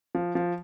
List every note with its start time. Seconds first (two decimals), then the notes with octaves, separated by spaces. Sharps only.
0.15 F3
0.35 F3